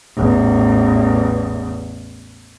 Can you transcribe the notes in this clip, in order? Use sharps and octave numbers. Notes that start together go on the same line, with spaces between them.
A1 E2